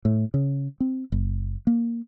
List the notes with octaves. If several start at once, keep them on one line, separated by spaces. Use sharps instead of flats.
A2
C#3
C4
F#1
A#3